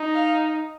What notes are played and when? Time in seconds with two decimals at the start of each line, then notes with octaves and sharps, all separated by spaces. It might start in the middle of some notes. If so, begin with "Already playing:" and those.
Already playing: D#4
0.14 F5